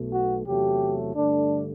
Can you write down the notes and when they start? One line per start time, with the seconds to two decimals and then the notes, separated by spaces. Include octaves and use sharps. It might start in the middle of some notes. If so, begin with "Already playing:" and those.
Already playing: B1 B2 A3
0.12 F#4
0.46 E2 C3 F#3 A3 G4
1.15 G2 D3 A3 D4